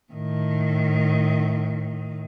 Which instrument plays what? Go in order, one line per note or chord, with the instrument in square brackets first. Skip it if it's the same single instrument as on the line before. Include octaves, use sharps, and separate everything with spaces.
[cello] A2 D#3